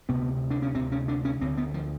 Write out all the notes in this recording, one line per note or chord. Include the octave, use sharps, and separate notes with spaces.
D2 C3 B3
D4
C#4
D2 C3 C4
C#4
D4
C#4
D2 D3 C4
B3
F3